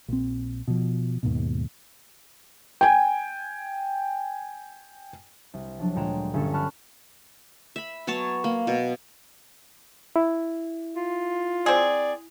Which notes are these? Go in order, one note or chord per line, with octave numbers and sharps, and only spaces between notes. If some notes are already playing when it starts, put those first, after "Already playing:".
A#1 C4
B2 F3
D#2 G#2 B2
G5 G#5
C2
F3 F#3 D4
D2 A#2 G#3 G5 A#5 E7
G1 C#4 A4
A5 B5 C#6 F6 F#6
E5 B5
F#3 B3 C#5 A5
A#3
B2
E4
F4
C4 G#4 D5